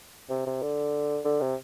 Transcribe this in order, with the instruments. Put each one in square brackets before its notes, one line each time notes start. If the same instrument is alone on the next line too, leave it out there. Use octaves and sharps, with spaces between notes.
[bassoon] C3
C3
D3
D3
C3